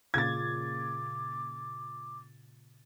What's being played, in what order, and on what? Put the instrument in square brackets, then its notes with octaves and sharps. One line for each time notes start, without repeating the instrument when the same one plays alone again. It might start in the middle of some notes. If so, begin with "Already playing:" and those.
[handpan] A#2 C#3 F4 [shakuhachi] D6 [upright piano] G#6 A6